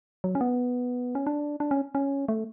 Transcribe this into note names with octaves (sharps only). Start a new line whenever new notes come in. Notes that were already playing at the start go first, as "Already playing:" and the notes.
F#3
C#4
B3
C#4
D4
D4
C#4
C#4
A3